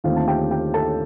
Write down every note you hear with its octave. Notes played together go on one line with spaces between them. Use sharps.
D#2 D3 A3 C4 F4 F5
A5
G4 G5
G4 G5
A4 A5